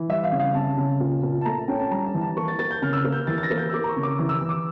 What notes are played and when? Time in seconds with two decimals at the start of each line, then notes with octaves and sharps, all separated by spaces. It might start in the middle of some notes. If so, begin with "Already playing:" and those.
Already playing: E3
0.09 G3 E5
0.24 F5
0.32 C#3
0.40 F5
0.54 C#3 A5
0.77 C#3
1.00 A#2
1.23 A#2
1.41 A5
1.45 A3 A#5
1.58 A5
1.68 C#4 G5
1.79 A5
1.91 G3 A#5
2.06 A5
2.14 E3
2.21 A5
2.37 A#3 C#6
2.48 A6
2.59 A#3 A6
2.71 G6
2.82 C#3 F6
2.93 E6
2.97 F6
3.04 A#3
3.12 G6
3.27 E3 A6
3.38 A6
3.43 A#6
3.50 A#3
3.58 G6
3.69 E6
3.73 A#3 D6
3.84 A#5
3.89 C#6
3.96 C#3
4.03 D6
4.19 E3 D6
4.29 E6
4.34 D6
4.41 E3
4.49 D6